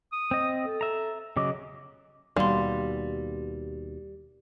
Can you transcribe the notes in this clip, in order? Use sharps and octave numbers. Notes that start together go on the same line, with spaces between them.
D#6
C4 D#5
A4
E5 A#5
C#3 F#3 D#5 D6
D#2 B2 G3 F5 C6